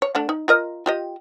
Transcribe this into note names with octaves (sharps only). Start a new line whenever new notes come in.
C#5
A3 D4 F#5
D#4
F4 A#4 D#5
F4 G4 D#5